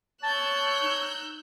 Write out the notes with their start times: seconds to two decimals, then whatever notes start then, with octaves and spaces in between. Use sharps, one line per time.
0.23 C#5 A5 E6 F#6 G6
0.82 D#4